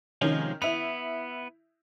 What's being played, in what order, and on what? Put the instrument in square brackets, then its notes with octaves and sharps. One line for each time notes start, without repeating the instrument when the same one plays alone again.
[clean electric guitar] C3 F3 G#3 [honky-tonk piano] D#3 C#4
[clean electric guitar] B3 [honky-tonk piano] E4 F7